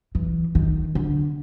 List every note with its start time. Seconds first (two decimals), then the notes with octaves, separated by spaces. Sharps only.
0.15 E3
0.55 D#3
0.95 D3